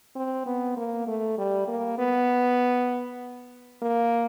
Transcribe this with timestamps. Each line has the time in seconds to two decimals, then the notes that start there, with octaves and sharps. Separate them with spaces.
0.15 C4
0.46 B3
0.77 A#3
1.07 A3
1.38 G3
1.67 A#3
1.98 B3
3.82 A#3